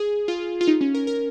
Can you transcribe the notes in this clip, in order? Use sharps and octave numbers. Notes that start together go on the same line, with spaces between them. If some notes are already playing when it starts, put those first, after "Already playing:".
Already playing: G#4
F4
F4
D#4
C#4
A#4
A#4